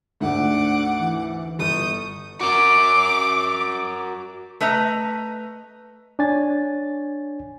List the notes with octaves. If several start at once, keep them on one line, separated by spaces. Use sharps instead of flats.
D2 G#2 A3 D4 F#5 D6
E3
G1 C#6 D#6 G6
F#4 A#4 D6
A3 B4 D#5 A#5
D4 C#5 G#5 A6